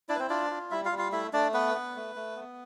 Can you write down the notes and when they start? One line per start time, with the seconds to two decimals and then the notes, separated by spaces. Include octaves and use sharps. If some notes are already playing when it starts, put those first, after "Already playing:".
0.09 D4 E4 D5
0.15 B4
0.19 C4 C5
0.29 D4 F4 D5
0.50 F4
0.71 G3 E4 E5
0.85 F4 F5
0.92 G3
0.98 F4 F5
1.12 A3 E4 E5
1.33 A3 D4 D5
1.54 B3 B4
1.75 B3
1.95 A3
2.16 A3
2.36 B3